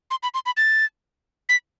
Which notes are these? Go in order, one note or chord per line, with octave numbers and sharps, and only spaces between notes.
C6
B5
C6
B5
A6
B6